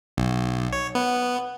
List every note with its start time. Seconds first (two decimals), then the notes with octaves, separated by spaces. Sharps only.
0.17 B1
0.73 C#5
0.95 B3